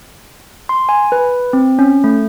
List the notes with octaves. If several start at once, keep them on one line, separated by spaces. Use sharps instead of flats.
C6
G#5
B4
C4
C#4
A3